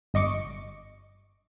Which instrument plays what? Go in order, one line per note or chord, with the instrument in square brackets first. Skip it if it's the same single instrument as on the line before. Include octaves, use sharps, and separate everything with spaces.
[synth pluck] G1 D#5 C#6 D6 C#7